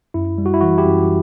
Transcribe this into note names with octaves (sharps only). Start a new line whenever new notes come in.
F#2 E4
G3
F#4
E4
E3 F#4
E4 G4
F#2